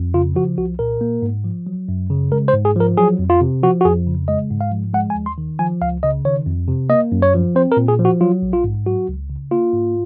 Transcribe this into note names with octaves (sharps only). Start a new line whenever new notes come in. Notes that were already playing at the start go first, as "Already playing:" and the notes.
Already playing: F2
C#3 F4
F3 F#4
C2 F#4
A#2 A#4
A#3
G#2
F3
F#3
F#2
C#3
G#3 A#4
C5
G#2
G#4
F3 A#4
F#3 G#4
F2
F4
C3
F3 F#4
F#4
F2 G#4
C#3
G#3 D#5
G#2
F5
F3
G#3 F#5
G#5
D#2
C6
D#3
F3 G#5
C#2 F5
C#3 D#5
D#3 C#5
F2
C3
A#3 D#5
F#2
C#5
F3
C4 C5
A#4
A#2
G#4
F3
F#4
F#3 F4
A#1
F4
G#2
F#3 F#4
C#2
C#3
A#3 F4
G#2